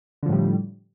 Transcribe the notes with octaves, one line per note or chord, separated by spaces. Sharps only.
A2 D3 F3 G3